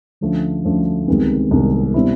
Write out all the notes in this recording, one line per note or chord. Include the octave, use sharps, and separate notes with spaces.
D2 D3 F3 A3 C#4
D2 D3 F3 A3 C#4
C2 C3 D#3 G#3 B3
C2 C3 D#3 G#3 B3
B2 G3 C4 E4